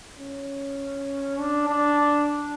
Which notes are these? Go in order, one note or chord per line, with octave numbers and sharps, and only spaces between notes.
C#4
D4
D4